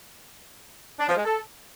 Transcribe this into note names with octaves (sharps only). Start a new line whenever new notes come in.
D4
F3
G#3
A4